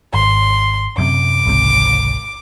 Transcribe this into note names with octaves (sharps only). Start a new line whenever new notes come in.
G#1 C6
F#2 C3 D6
G#1 C#2 C3